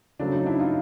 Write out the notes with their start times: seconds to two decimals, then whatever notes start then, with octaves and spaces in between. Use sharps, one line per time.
0.19 C#3 F#3 A3 C4 D4
0.32 D#4
0.46 D4 E4
0.60 D#4 F4